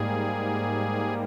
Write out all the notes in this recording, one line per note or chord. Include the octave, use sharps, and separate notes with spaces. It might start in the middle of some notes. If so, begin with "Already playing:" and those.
Already playing: G#2 G3 A#3 G#4